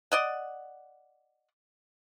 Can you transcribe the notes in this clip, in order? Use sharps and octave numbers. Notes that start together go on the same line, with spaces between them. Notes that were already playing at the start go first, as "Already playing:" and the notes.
D5 D#5 F#5